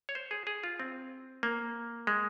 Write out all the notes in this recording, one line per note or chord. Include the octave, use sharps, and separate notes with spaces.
C#5
C5
G#4
G#4
F4
C4
A#3
G#3